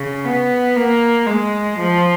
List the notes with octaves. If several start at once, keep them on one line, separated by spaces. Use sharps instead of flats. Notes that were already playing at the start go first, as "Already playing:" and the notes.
Already playing: C#3
B3
A#3
G#3
F3